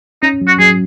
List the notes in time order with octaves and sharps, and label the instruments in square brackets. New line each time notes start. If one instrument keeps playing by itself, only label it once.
[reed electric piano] C#4 [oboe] D#4
[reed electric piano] F#3
[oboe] F#4
[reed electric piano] F#3 [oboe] G#4